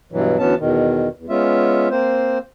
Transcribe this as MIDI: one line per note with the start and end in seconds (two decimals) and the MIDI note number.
0.12 0.38 43
0.12 0.38 47
0.12 0.38 52
0.12 0.38 54
0.39 0.55 38
0.39 0.55 52
0.39 0.55 59
0.39 0.55 61
0.39 0.55 81
0.59 1.09 40
0.59 1.09 47
0.59 1.09 51
1.17 1.26 40
1.29 1.89 56
1.29 1.89 59
1.29 1.89 61
1.29 1.89 65
1.29 1.89 76
1.90 2.38 58
1.90 2.38 60
1.90 2.38 72